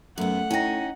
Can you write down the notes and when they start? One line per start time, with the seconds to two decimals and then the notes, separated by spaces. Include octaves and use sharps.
0.18 F#2 A2 B3 F#5
0.51 C#4 D#4 E4 G5 A#6